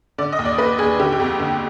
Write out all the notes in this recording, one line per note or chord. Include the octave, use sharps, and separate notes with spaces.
D3 D5
D#5
D#2
D5
D#2 B4
D#2 G#4
D3 G4
G4
F2
D3